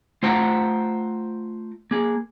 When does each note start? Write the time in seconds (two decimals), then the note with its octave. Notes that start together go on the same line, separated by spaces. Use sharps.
0.23 A3 F4 C5 F#5 G5 A#5
1.91 A#3 G#4